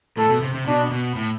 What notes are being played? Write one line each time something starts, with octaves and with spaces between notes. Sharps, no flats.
A2 A4
B2
C3
C3
B2 D4
B2
A2